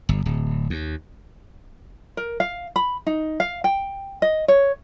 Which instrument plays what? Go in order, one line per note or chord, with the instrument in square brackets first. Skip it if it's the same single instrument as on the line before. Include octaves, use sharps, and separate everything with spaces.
[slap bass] G1
D1
D#2
[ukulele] A#4
F5
B5
D#4
F5
G5
D#5
C#5